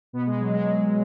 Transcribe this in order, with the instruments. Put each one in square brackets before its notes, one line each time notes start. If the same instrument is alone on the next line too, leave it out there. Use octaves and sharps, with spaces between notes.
[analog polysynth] B2 B3
G#3
F#3
G#3